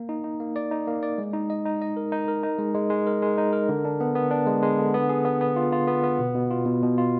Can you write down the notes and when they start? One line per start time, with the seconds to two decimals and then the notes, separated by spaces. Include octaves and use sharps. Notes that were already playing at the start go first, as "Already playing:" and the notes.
Already playing: A#3
0.09 D#4
0.24 D#4
0.40 A#3
0.56 D5
0.71 D#4
0.87 A#3
1.03 D5
1.18 G#3
1.33 D#4
1.50 D#5
1.65 D#4
1.82 D#5
1.97 A#4
2.12 D#4
2.28 A#4
2.43 D#4
2.59 G#3
2.74 G#3
2.90 G#3
3.07 A#4
3.22 G#3
3.38 D#4
3.53 A#4
3.69 D3
3.85 D4
4.00 B3
4.16 B3
4.31 D4
4.47 G#3
4.62 G#3
4.79 D3
4.94 B3
5.09 G#4
5.25 B3
5.41 B3
5.56 F4
5.72 F4
5.87 B3
6.03 B3
6.19 B2
6.35 B2
6.50 F4
6.66 B2
6.82 B2
6.98 F4